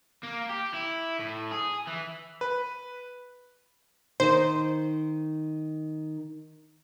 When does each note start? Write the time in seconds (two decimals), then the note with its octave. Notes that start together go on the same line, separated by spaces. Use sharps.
0.23 A#3
0.50 G4
0.74 E4
1.19 A2
1.51 G#4
1.88 E3
2.41 B4
4.20 D#3 C5